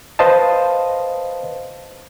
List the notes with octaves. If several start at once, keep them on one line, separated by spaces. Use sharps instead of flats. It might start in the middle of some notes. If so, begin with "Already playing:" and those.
B4 C5 D#5 F5 A5